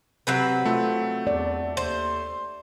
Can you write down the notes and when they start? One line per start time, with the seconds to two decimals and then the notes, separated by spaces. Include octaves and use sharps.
0.27 C3 F#3 C4 B4
0.66 A3 F4
1.27 E2 D5
1.77 D#2 C5